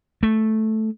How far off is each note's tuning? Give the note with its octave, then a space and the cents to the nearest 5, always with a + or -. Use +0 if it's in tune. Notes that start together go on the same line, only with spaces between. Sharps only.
A3 -5